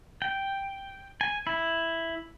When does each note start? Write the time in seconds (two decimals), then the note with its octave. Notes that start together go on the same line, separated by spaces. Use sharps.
0.22 G5
1.21 G#5
1.47 E4